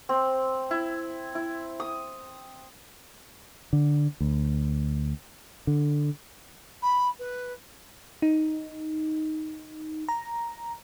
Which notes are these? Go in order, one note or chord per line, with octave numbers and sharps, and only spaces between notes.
C4
E4
E4
D#6
D3
D2
D3
B5
B4
D#4
A#5